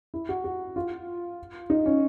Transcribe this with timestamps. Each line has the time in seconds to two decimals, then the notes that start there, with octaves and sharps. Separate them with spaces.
0.14 E4
0.29 F#4
0.44 F#4
0.76 F4
1.70 D#4
1.86 C#4